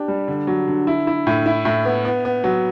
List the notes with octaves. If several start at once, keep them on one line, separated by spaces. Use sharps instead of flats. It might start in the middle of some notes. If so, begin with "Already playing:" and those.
Already playing: D4 G4
G3
D3
F#3
D3
E4
E4
A2
E4
A2
B3
B3
B3
F#3